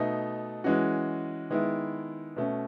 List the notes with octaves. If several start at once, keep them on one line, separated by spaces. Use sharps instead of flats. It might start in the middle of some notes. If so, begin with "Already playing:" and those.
Already playing: B2 A3 D#4
E3 G#3 C#4 F#4
D#3 G#3 B3 E4
B2 A3 C#4